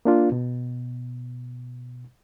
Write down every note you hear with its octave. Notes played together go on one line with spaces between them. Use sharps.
A#3 D4 F4
B2